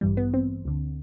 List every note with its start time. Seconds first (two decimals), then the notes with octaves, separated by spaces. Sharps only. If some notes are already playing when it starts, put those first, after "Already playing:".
0.01 A1 G2 E3 G3
0.17 B3
0.34 C4
0.65 D2 D3